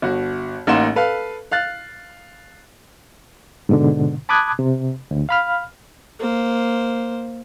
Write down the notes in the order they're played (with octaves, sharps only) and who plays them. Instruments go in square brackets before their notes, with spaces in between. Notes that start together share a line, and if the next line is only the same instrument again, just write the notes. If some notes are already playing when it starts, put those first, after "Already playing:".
[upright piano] G1 F#4
A1 A#3 D#4 F#5 C6 E7
A4 B4 F5
F5 F#6 A6
[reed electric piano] G#2 B2 D3
A5 B5 D6 D#6 F#6 G#6
C3
D2
F5 B5 F6
[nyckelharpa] A#3 C5